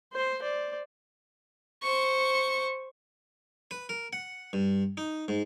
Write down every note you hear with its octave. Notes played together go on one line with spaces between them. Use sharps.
C5 C6
C5 D5
C5 C#6
B4
A#4
F#5
G2
D#4
G#2